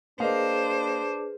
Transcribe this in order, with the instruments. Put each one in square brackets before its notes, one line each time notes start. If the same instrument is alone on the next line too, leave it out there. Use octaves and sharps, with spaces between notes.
[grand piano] A#3 D#5 F5 [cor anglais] D4 [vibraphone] G#4 B4 [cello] C5